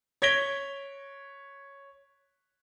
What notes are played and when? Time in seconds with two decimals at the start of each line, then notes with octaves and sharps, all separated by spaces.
0.22 C#5 G#6 A#6 B6 D7 G7